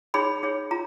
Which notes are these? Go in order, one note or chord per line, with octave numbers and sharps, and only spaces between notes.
D#4 G#4 C#5 B5
D#4 G#4 C#5
F4 A#5